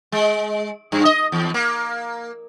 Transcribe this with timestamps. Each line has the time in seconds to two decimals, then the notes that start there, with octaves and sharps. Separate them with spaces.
0.12 G#3
0.92 G2
1.05 D#5
1.32 E2
1.54 A#3